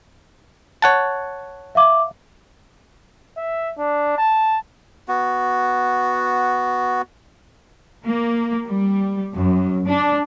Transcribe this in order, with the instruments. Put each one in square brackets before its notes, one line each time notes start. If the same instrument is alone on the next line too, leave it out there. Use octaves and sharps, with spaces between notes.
[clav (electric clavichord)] C#5 F#5 A5
[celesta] E5 F5 D6
[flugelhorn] E5
D4
A5
[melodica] B3 F#4
[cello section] A#3
G3
F#2
D4